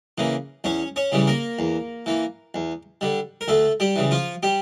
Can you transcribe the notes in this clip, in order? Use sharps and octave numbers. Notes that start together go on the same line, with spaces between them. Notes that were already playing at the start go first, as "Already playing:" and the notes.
C#3 E3 A#3
E2 C#4 C#5
C#4 C#5
C#3 E3 G3
A#3 A#4
E2
E3 A#3
E2
D3 G3
A#4
D2 A3 A4
G3 G4
C#3 E3
F3 F4
G3 G4